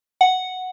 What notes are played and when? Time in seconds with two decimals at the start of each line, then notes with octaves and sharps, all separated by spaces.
0.21 F#5